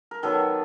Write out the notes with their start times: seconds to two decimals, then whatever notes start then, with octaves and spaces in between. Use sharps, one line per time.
0.11 A#4
0.23 D#3 F#3 B3 A4 B4